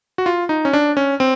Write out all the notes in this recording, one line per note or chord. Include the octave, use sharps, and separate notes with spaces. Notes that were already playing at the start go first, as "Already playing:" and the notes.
F#4
F4
D#4
C#4
D4
C#4
C4